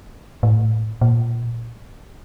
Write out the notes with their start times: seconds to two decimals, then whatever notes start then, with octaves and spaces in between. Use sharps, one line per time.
0.43 A2
1.01 A#2